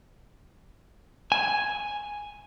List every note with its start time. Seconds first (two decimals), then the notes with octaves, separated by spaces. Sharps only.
1.32 G#5